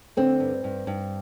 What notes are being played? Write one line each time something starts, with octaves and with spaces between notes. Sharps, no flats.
D3 C4
G2
G2
G2